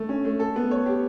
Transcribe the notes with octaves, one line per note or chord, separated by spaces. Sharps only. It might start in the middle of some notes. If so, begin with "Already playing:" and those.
Already playing: A3
C#4
A3
A4
B3
C#5
G4